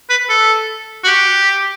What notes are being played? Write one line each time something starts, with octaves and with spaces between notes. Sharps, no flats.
B4
A4
F#4
G4